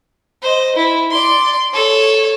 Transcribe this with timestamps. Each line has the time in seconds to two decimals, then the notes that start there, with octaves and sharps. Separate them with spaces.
0.42 C5 D#5
0.76 E4
1.11 D5 C6
1.73 A4 C#5